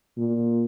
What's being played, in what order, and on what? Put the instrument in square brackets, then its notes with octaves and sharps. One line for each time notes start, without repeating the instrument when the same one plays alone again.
[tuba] A#2